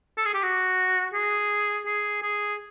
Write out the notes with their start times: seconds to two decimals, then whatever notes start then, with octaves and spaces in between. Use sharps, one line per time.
0.17 A4
0.25 G#4
0.34 G4
0.43 F#4
1.14 G#4
1.86 G#4
2.22 G#4